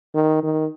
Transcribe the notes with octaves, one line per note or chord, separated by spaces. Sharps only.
D#3
D#3